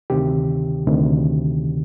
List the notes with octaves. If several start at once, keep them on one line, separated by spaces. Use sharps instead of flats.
D2 C3 D#3 G4
D2 C3 D#3